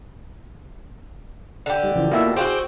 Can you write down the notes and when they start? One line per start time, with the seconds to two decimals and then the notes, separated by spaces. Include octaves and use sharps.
1.66 D3 G4
1.84 G3 D#4
1.96 C#3 E3 F3
2.11 B2 A#3 E4 F4 E5
2.36 C4 F4 F#4 G#4 D6 G6